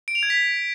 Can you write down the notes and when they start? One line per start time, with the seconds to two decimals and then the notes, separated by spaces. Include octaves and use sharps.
0.08 D7
0.15 F7
0.23 G#6
0.30 B6